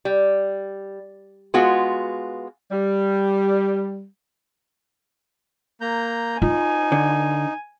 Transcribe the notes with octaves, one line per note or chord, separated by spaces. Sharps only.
G3
G#3 B3 F4 F#4
G3
A#3 A#5 G6
D#4 F4 G#5
D3